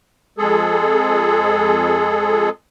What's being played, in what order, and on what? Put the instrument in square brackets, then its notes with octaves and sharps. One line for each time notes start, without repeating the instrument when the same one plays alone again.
[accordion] F2 G#3 G#4 A4